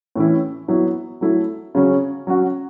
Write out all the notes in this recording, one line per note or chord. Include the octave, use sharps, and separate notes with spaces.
A2 E3 C#4 E4
F#3 B3 E4
F#3 A3 E4
C#3 F#3 C#4
F#3 C#4 F#4